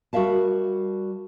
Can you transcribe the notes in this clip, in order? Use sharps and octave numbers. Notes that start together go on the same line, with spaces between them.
G3 F#4 A#4 E5 F5 A5